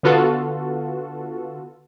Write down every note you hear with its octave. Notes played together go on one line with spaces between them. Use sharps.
D3 B3 F4 F#4 A4